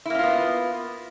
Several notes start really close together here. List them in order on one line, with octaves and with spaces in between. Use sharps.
E4 A#3 C#4 F4 B3